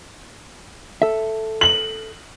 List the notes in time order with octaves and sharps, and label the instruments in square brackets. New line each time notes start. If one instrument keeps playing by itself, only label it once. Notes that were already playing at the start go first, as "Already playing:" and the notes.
[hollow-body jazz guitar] A4 E5
[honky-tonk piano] F#7